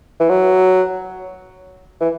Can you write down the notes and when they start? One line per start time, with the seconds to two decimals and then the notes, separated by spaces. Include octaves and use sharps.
0.20 E3
0.29 F#3
2.00 E3